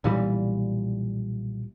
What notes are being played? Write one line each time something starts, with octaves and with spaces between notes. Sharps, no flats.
B1 A#2 E3 G3